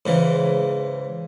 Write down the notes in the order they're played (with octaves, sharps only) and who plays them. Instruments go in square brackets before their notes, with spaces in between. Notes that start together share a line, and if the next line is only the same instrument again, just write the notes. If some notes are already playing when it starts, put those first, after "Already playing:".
[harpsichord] G#2 C#3 E3